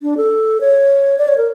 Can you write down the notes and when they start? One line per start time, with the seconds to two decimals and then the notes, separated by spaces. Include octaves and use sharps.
0.03 D4
0.17 A4
0.61 C#5
1.18 D5
1.28 C#5
1.38 A#4